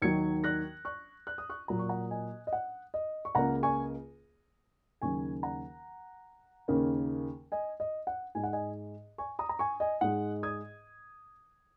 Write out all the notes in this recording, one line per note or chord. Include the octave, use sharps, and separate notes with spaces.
D#2 D#3 F#3 G#6 C#7
F#6 A#6
C#6 F#6
F#6
D#6
C#6 F#6
A#2 F#3 A#3 A#5
C#6
F#5 A#5
D#5 G#5
D#5
F#5
D#5
C#6
C#2 C#3 A#3 F#5 A#5
G#5 C#6
D#2 C#3 F#3 G#5 C#6
F#5 A#5
D#2 C#3 A#3
D#5 G#5
D#5
F#5
G#2 G#3 G#5
F#5
D#5 G#5
G#5 C#6
A#5 D#6
A#5
G#5 C#6
D#5 G#5
G#2 G#3 F#5
D#6 G#6